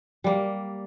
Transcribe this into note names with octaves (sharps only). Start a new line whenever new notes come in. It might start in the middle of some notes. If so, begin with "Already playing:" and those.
G3 A#3